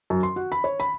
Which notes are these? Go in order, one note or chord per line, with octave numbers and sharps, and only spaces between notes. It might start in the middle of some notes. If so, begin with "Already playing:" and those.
F#2
C6
F#4
B5
C#5
B5